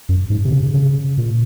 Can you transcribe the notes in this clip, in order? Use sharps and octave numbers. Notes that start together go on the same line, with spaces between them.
F#2
G#2
C3
C#3
C#3
A#2